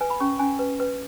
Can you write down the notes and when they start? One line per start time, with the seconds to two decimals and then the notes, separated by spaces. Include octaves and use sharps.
0.01 B4 G#5
0.10 B5
0.20 C#4 C#6
0.39 C#4 G#5
0.59 B4
0.80 B4